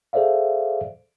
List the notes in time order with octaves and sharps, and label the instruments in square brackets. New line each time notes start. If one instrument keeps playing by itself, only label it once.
[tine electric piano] G#4 A4 C5 D5 E5 F5